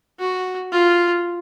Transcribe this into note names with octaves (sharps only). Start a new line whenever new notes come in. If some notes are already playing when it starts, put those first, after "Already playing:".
F#4
F4